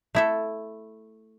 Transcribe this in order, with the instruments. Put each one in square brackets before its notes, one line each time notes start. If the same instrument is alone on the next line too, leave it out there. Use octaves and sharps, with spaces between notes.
[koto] A3 E4 A4